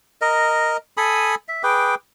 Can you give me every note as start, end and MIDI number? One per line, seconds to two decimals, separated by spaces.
0.21 0.77 70
0.21 0.77 75
0.97 1.35 69
0.97 1.35 80
0.97 1.35 83
0.97 1.35 87
1.48 1.62 76
1.63 1.95 68
1.63 1.95 71
1.63 1.95 79
1.63 1.95 86